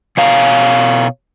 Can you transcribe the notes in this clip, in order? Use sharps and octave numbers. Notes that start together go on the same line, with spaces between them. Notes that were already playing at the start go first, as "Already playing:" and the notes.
B2 C#5 F5 A#5